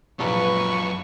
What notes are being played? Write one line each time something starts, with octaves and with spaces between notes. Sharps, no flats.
A#1 F#2 F4 B4 C#6